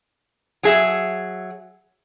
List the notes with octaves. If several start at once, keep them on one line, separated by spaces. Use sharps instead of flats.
F#3 G#4 E5